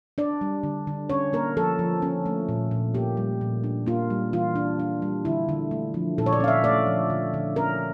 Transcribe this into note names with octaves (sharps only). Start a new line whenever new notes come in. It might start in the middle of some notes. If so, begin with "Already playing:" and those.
D4 D5
G3
D3
D3
C#4 C#5
A#3 A#4
F3 A4
F3
C#4
A3
A#2
A#2
A#3 G4
G3
A#2
D4
A#3 F4
G3
E3 F4
D4
D4
G3
D3 E4
D3
A3
F3
A#2 A4
C#5
D5
C#4 F5
E5
A3 D5
F3
D3
D3
C#4 A#4